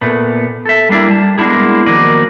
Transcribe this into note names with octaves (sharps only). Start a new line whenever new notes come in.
A#2 A3 B3
A4 E5
G3 A#3 D4 E4
G3 A5
G#3 A#3 B3 D4 E4 G#4
D#3 F3 F#3 A#3 D5 D#5